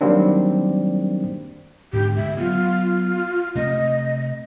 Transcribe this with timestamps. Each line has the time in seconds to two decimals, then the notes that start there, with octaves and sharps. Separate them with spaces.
0.01 D#3 F#3 G3 A#3 C4 D4
1.93 G#2 D3 G4
2.17 D2 G2 D3 E5
2.38 F#3 B3 F4
3.55 C3 A3 C4 D#5